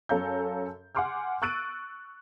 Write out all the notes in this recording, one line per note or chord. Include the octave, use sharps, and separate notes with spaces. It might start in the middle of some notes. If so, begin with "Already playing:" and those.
F#2 C#4 A4 F5 A#5 G6
F#5 G#5 C6 D6 F6 G6
C#6 E6 F#6 A6 D7 D#7